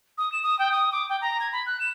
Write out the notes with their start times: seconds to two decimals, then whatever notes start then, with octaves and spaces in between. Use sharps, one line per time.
0.18 D#6
0.32 E7
0.43 D#6
0.59 G5
0.72 D#6
0.92 D6
1.09 G5
1.21 A#5
1.40 G#6
1.53 B5
1.66 F#6
1.80 E7